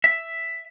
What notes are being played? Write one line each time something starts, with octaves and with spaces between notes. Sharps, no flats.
E5